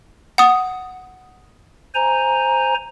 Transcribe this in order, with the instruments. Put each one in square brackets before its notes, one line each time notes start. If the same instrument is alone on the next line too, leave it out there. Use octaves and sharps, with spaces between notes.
[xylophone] F#5 D#6
[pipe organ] C5 G#5 A#5